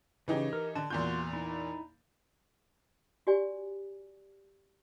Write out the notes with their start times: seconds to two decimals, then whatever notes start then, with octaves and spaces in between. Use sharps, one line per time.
0.28 C#3 E3 D#4 G4
0.53 A#4
0.75 D3 A5
0.90 E2 A#2 F4 F#4 C6 G6
1.33 D#4 E4
3.27 F#4 G4 D5 G#5